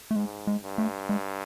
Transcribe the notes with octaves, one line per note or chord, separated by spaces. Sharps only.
A3
G#2 G#3
G#3
G2
A3
G#3